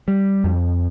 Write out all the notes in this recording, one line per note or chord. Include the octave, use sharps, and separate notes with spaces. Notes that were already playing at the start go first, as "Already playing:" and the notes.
G3
F2